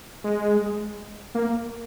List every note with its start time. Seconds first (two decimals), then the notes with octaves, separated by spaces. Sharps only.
0.24 G#3
1.35 A#3